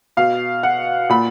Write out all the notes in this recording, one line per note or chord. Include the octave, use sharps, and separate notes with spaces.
B2 F5
F#5
A#2 B5